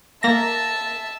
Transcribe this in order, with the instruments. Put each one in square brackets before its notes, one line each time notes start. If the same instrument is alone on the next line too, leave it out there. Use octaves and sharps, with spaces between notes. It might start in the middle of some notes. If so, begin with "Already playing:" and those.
[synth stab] A#3 A#6 [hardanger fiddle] E5 A5